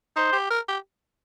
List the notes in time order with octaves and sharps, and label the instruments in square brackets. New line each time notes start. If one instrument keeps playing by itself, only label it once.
[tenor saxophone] D#4 [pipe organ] C5
[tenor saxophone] G4
A#4
G4